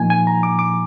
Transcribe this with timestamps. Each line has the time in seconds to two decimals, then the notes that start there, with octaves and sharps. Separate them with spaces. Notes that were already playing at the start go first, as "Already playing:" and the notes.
Already playing: A#2 F3 A#3 D#4 G#5
0.10 G#5
0.27 A#5
0.43 D6
0.59 D6